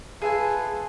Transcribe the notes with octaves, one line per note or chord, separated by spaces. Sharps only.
F4 G#4 A4 B4 E5 G#5